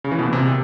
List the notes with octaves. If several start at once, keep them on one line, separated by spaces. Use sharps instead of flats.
C#3
E3
B2
A#2
C3